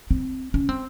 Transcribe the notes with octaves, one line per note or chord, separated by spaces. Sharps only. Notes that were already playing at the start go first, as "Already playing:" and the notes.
C4
C#4
C4